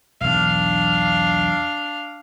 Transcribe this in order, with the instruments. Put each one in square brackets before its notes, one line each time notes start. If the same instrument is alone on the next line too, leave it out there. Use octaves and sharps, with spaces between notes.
[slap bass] B1 E2 D3 [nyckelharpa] D4 F5